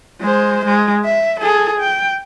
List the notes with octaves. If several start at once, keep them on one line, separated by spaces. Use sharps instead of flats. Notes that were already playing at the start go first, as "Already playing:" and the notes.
G#3 C5
G#3
E5
G#4 A4
G5